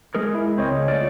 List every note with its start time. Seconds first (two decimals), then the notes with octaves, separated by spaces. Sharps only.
0.15 G#3 G#4 A#4
0.34 E4
0.58 C#2 C4 C#5 D#5
0.71 C#3
0.88 A3 F4 D5